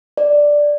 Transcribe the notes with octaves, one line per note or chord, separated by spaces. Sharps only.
D5